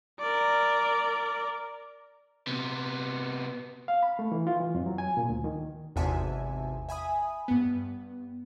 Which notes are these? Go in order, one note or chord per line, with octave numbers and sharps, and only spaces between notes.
A#4 D5
C3 B3
F5
B5
A3
E3
F4
E3
F2
F#3
G#5
A#2
D2
D#3
G#1 E2 C3 E5 G#5 A5
E5 G#5 B5 D#6
G2 B3